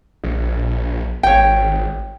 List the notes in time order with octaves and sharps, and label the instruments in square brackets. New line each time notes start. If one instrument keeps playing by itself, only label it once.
[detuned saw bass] A#1
[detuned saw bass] G#1 [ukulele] C#5 G5